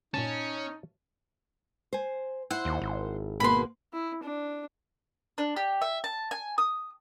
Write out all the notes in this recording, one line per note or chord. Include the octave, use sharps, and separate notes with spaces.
G1 A#2 C#4 D#4 A5
C5 G#5
E4 C5 F#5
D#2
G#1
B2 A#3 B4 B5 C6
E4
D4
D4
G4
E5
A5
G#5
D#6